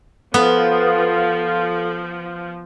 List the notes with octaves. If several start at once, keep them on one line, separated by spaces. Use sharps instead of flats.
F3 B3 F4 A4